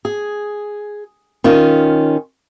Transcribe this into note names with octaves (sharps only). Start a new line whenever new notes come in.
G#4
D#3 C#4 F4